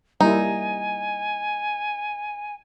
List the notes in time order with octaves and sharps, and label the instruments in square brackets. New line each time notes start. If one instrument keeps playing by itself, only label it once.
[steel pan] G3 A#3 E4 [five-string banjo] D#4 [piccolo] G#5